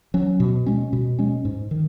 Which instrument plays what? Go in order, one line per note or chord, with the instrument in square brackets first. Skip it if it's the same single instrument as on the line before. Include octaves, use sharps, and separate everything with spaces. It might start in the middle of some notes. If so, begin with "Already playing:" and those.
[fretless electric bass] F#3 C#4
B2
G#3 C#4
B2
G#3 C#4
G#2
D#3